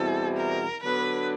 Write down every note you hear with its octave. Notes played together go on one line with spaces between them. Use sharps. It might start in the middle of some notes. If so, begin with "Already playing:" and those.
Already playing: E2 B2 G3 C4 E4 A4
A#4
D3 F#3 B3 D4 B4